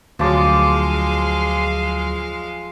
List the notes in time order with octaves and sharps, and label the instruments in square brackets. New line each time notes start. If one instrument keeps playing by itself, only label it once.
[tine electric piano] D2 F#3 A6 [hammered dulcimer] F3 D6 [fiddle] G#3 F5